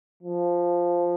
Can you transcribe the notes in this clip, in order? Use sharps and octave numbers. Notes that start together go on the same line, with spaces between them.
F3